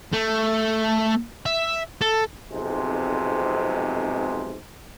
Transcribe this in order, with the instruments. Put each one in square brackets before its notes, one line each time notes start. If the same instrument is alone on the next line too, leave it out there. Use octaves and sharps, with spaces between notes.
[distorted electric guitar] A3
E5
A4
[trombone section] B1 F2 G#2 C3 G#3